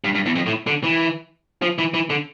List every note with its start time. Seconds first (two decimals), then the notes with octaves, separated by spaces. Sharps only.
0.04 G2
0.15 G2
0.26 E2
0.35 F2
0.46 A2
0.67 D3
0.84 E3
1.62 F3
1.78 E3
1.94 E3
2.10 D3